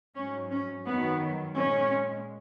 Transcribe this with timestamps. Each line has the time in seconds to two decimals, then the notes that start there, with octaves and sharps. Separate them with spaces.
0.15 G#2 F#3 C#4
0.51 C#4
0.86 F#2 D#3 F#3 B3
1.57 A#2 G#3 C#4